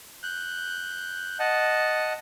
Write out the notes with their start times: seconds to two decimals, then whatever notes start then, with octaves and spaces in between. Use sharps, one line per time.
0.23 F#6 G6
1.39 D#5 F#5 A5